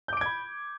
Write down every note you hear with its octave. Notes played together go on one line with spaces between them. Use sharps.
B5 D6 G6 G#6 D7